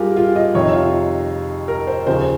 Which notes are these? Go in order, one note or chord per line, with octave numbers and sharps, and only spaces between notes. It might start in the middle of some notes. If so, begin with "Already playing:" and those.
Already playing: G2 F4 G4 G#4 A#4
F4
D#5
F2 C3 D#3 C#5
D#4
F4
A#4
C5
D#2 C#3 F3 C5